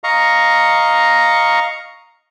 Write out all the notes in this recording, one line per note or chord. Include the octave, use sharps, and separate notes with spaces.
D#5 F5 A#5 C#6